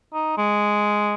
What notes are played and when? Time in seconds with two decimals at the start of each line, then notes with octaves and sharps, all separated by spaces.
0.13 D#4
0.38 G#3